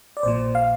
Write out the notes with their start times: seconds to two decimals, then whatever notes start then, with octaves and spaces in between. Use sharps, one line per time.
0.17 D5
0.23 A#1 A#2 F3 C5
0.55 F5